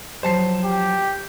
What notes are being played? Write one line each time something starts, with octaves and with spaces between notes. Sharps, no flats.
F3 F#3 C5 C#5 A5 C7
G4